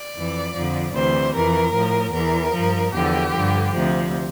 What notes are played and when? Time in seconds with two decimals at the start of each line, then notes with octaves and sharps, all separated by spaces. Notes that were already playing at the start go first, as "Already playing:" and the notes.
Already playing: D5
0.16 F2 E3
0.55 F2 D3 F3
0.94 D2 C3 E3 C5
1.34 F2 E3 A#4
1.74 A2 F3
2.13 E2 E3 A#4
2.54 G2 F3
2.93 E2 D3 F3 G4
3.33 G2 D3 F3
3.72 D2 C3 F3